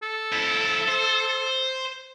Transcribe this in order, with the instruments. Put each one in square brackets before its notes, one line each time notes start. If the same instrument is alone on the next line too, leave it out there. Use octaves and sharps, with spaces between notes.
[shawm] A4
[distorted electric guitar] F2 E4
C5